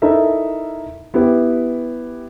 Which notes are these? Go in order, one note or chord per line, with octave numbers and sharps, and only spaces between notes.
D#4 E4 A4 A#4 E5
B3 E4 G4 B4